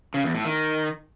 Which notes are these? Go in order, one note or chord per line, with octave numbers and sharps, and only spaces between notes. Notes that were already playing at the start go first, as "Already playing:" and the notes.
C#3
E2
A2
D#3